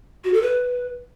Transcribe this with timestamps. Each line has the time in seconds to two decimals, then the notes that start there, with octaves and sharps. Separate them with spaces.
0.24 F#4
0.33 A4
0.42 B4